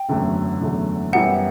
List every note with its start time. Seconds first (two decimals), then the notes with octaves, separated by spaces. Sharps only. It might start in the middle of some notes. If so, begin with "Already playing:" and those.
Already playing: G5
0.09 F#1 E2 D3 F#3 A3
0.60 F#1 E2 D3 F#3 A3
1.13 F#2 E3 G3 B3 E4 F#5